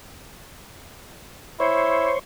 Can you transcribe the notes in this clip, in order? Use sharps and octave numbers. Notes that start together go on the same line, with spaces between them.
E4 C5 C#5